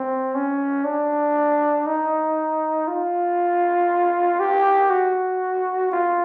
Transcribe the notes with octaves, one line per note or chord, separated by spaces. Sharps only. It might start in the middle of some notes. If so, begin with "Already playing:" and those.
Already playing: C4
C#4
D4
D#4
F4
G4
F#4
F4